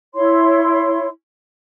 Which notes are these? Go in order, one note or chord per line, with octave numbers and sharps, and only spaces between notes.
E4 C#5 C6